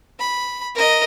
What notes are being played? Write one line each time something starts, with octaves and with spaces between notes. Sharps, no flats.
B5
A#4 D#5